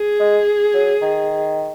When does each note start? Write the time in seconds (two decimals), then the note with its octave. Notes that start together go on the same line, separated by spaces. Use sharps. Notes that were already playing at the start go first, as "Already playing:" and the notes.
Already playing: G#4
0.20 G#3
0.74 F#3
1.02 D#3